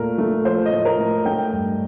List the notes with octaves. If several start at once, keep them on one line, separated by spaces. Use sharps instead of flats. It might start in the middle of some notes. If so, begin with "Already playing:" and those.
Already playing: A#2 A3 A#4
A3
F3 C5
D#5
A2
A#4
A2
A3 G5
G2